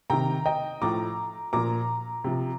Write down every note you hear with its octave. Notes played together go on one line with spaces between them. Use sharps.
C3 D#3 G5 A#5
D#5 G5
A2 F3 A#5 D6
A#2 F3 A#5 D6
C3 F3